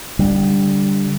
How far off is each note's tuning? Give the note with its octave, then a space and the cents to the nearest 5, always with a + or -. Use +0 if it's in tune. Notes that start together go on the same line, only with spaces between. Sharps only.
D3 -15 G3 +0